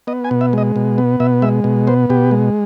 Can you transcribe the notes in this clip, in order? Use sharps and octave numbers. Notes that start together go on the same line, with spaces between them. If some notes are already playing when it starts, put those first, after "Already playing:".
B3 D#5
G#5
B2
E5
G#3 D#5
B2
B3
B2 E5
G#3 E5
B2
B3 C5
B2 G4
G#3